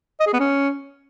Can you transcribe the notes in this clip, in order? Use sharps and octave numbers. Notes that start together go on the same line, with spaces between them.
D#5
G#4
B3
C#4